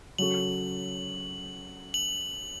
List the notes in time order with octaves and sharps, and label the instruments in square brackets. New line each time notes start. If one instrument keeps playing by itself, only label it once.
[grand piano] C#3 F#3 C#4 F#4 A4 [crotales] F#7
[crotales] F#7